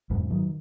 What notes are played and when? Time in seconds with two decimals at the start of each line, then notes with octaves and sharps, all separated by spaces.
0.10 E2 G#2
0.30 D#3 F#3